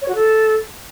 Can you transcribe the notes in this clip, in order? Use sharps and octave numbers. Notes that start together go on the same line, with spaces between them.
C#5
F#4
A4